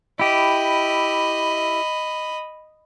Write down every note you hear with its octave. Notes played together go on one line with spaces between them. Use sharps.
E4 G4 D#5 B5